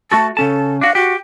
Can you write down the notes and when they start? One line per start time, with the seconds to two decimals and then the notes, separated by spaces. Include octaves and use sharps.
0.12 A3 F#4 A4 A5
0.37 C#3 C#4 A4 A5
0.81 D4 F#4 F5
0.95 F#4 G4